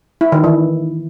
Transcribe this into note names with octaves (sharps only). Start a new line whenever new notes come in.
E4
D#3
E3